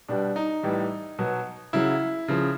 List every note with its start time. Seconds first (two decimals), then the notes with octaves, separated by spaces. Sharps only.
0.08 B2 G3 D4
0.36 D#4
0.63 A2 E3 G3
1.19 B2 F#3
1.73 C#3 F#3 E4
2.28 C#3 F3